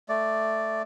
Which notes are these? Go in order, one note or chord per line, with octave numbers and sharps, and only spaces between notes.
A3 D5